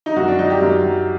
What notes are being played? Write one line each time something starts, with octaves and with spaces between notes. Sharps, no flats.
D#4
F#2 F#4
D4
F#3 D#4
G4
F#2
F#3